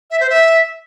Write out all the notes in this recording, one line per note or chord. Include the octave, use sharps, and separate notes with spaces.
E5
C5
E5